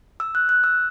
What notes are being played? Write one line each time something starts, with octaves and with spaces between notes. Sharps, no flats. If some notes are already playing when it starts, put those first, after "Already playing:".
E6
F#6
F#6
E6